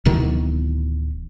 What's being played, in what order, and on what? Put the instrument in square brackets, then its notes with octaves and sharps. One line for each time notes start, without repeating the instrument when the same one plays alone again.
[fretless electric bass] D1 B2 D#3 E3